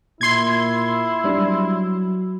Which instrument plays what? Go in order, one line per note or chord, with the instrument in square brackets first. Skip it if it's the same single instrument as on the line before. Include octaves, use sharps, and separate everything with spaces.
[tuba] A#2 [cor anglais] E4 [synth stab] C6 G#6
[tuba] F#3 [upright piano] G3 D4